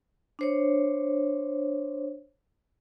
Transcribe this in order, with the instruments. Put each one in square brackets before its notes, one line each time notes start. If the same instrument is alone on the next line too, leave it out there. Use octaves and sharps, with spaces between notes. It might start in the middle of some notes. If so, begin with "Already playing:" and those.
[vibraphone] D4 C5 C#5